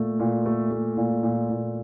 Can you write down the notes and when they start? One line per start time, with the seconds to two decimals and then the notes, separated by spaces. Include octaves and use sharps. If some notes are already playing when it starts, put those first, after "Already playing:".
Already playing: A#2 A3
0.20 A#2
0.46 A3
0.71 A3
0.97 A#2
1.23 A#2
1.50 A#2